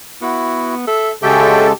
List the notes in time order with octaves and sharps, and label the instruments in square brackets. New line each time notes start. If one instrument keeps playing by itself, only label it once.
[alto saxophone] B3 [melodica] E4 F#4
[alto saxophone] A4 [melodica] E5
[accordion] C#3 G#3 A4 [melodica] F#4 E5 G5 [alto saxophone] G4